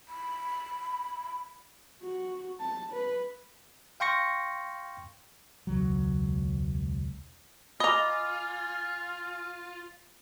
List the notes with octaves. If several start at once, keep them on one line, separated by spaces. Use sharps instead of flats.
B5
F#4
A5
B4
F5 G5 C6 C#6 A#6 C#7
E1 C#2 F#3
F4 D#5 G#5 A#5 B5 D6 F6